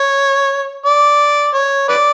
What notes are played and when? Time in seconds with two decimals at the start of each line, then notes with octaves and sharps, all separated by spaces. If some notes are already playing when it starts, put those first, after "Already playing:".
Already playing: C#5
0.86 D5
1.55 C#5
1.89 B4 D5